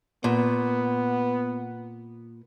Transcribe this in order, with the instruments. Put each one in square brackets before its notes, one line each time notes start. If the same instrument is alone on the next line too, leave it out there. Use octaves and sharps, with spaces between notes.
[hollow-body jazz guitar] A#2 [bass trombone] B3